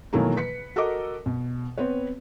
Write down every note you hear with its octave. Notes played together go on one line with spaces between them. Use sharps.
B2 D#3 E3 F#3 A3 A#3
B4 B6 C#7
F#4 A4 A#4 D#5 D6
B2
B3 C4 B4 C#5